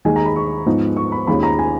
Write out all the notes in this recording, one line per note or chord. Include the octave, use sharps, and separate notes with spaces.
D#2 D#3 G#3 D#4 G#5
A#5
B5
C#6
G#2 F3 B3 D#4
C#6
B5
D#2 D#3 G#3 C#4 F4 B5
A#5
G#5